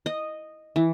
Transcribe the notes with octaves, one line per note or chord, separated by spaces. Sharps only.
D#5
E3